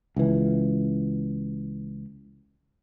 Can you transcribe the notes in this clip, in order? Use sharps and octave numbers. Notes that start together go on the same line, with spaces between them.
C#2 E3